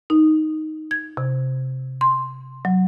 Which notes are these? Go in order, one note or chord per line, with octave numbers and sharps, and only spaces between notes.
D#4
G#6
C3
C6
F#3